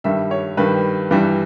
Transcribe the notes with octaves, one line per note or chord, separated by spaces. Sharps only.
G2 D#3 G3 E5
C#5
G2 D#3 G3 B4
G2 E3 G3